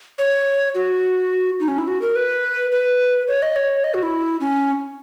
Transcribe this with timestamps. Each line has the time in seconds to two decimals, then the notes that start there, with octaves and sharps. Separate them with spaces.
0.18 C#5
0.75 F#4
1.60 D#4
1.68 C#4
1.78 E4
1.88 F#4
2.02 A#4
2.16 B4
2.72 B4
3.28 C#5
3.42 D#5
3.56 C#5
3.84 D#5
3.94 F#4
4.03 E4
4.41 C#4